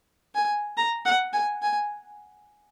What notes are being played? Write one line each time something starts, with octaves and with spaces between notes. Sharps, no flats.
G#5
A#5
F#5
G#5
G#5